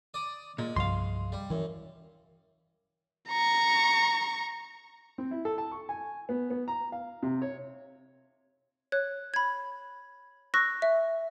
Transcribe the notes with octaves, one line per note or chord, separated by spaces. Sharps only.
D5 D#6
A#2 G#3
C2 G2 F3 F5 C6
G3
F#2 E3
A#5 C#6
C4
E4
A4
A5
C#6
G#5
B3
B3
A#5
F5
C3
C#5
C#5 F#6
B5 G#6
C#6 E6 F#6 A#6
E5